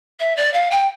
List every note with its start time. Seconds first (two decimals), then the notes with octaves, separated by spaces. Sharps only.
0.20 E5
0.36 D5
0.53 F5
0.71 G5